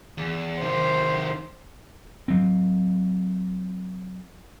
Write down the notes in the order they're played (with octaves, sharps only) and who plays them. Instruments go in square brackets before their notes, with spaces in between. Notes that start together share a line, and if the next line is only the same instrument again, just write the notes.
[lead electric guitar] E2
[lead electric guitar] C3 D#3 [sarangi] C5
[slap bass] F#3 C4